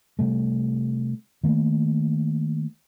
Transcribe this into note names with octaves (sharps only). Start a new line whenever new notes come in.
C3 G3 A3
D#3 A3 A#3